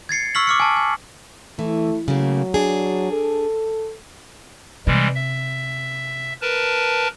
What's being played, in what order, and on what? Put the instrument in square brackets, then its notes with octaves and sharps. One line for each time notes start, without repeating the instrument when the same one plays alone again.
[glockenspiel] G#6 A6 C7 C#7
C#6 E6 F6 B6 F#7
D6 F6 C#7
G#5 A5
G#5
[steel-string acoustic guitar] E3 [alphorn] A3
[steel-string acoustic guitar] C#3 A3 A#3 [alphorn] F#3
[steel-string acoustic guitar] D4 G#4
[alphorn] A4
[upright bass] C3 [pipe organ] E3 G3 G#3
[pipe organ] E5
A#4 B4 A5